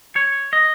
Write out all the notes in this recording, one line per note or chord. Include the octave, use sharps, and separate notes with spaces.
C#5
D#5